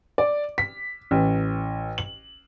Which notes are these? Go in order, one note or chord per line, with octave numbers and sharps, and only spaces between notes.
D5
B6
A1
F#7